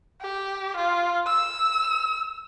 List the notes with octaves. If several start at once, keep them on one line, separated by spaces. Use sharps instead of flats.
G4
F4
E6